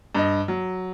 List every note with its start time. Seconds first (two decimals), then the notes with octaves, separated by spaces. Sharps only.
0.15 G2 D#5
0.48 F#3